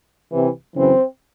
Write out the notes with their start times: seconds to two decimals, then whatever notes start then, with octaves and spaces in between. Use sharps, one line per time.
0.32 C2 C3 E3
0.76 F#2 C#3 E3 C4